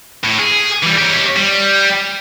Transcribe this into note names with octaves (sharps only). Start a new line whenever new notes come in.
A2
G#4
E3 G3
G4 C#5
G3